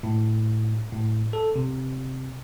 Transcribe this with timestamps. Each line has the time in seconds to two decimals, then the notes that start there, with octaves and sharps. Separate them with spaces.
0.03 A2
0.93 A2
1.33 A4
1.56 C3